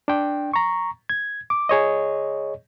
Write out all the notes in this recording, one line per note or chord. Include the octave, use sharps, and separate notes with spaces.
D4 G5
A#5 C#6
G#6
D6
G#4 C#5 D#5